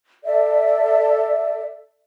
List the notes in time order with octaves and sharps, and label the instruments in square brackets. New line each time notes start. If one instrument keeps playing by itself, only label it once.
[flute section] A4 D5 E5